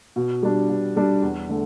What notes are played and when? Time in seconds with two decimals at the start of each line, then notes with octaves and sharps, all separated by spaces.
0.16 B2
0.43 G3 D4
0.69 B2
0.96 G3 D4
1.22 E2
1.49 D3 A3